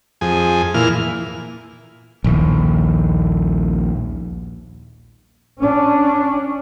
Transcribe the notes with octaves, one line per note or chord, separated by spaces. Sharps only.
F2 G#4
A#2 E3 F6
A#1 D#2
C#4 D4